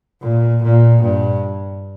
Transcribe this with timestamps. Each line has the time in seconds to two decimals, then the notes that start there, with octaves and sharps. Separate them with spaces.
0.21 A#2
0.62 A#2
1.02 G2